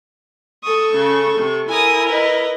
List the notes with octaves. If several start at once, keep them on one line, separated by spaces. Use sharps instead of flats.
A4 C#6 D#6
C#3
C3
E4 A#4 G#5 D#6
B4 D#5